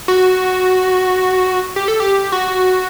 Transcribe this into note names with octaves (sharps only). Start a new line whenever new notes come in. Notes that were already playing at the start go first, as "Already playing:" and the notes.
F#4
G4
A4
G4
F#4